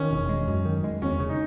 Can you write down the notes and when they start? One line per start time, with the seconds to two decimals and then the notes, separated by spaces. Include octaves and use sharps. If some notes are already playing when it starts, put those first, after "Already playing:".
Already playing: D#3 C#4
0.11 E1
0.29 G#3
0.48 F#2
0.65 D#3
0.84 G#3
1.02 E2 C#4
1.20 C#3
1.29 D#4